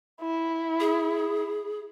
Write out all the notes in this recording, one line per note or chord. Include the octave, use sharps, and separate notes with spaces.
E4
G#4